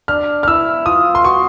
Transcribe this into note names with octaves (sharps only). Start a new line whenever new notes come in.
D4 F6
F6
E4 E6
F4 D#6
C6
F#4 C#6